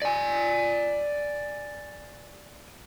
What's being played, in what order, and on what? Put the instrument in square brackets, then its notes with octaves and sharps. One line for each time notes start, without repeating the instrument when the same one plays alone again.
[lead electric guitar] D5 G#5